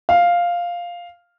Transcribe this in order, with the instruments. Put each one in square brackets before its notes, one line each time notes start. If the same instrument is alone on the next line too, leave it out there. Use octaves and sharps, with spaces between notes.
[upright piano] F5